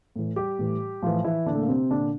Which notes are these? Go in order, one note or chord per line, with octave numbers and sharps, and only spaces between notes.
A2 E3
G3 G4
A2 E3
A2 E3 F3 F4
E3 E4
A#2 D3 D4
A3
A#3
C3 C4
A#2 D3 D4